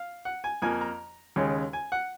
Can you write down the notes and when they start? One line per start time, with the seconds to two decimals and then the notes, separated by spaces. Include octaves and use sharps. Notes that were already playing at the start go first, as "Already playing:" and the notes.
Already playing: F5
0.25 F#5
0.44 G#5
0.62 F2 F3 A#3 G#5
0.81 A#5
1.36 D#2 C#3 G#3
1.73 G#5
1.92 F#5